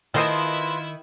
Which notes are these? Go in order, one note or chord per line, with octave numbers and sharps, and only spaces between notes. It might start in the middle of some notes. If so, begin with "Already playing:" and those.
D#3 E4 F4 A4 B4 C5 D#5